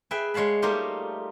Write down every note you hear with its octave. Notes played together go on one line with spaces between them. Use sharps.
G#4 B4 E5 G5
G#3 C#5 F5 A5 B5
G3 A3 A#3 D#4 F4 G4